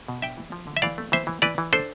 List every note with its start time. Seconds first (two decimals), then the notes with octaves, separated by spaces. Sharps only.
0.08 B2
0.22 D4 E5 G5
0.37 E3
0.52 F3
0.67 D3
0.77 E5
0.82 E3 D5 F5
0.98 A3
1.12 E3 C5 E5
1.27 E3
1.42 E3 B4 D5
1.58 E3
1.73 D4 A4 C5